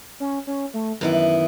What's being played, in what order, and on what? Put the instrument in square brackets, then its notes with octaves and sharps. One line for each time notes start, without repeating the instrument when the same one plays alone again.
[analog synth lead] C#4
C#4
A3
[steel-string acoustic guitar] F#2 E3 B3 E4 [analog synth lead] D#3